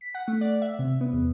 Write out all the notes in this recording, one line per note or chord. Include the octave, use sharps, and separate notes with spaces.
B6
F#5
A3
D5
E5
C3
B3
E2